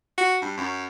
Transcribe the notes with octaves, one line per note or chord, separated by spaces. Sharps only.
F#4
G2
F#2